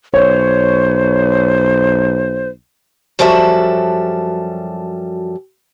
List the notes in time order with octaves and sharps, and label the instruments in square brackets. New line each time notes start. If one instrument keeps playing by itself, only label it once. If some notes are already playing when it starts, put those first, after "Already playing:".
[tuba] B1 [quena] C5 [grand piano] C#5
[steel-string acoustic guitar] F#2 F3 G3 F#4 A4 E5